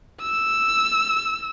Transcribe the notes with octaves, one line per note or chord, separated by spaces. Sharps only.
E6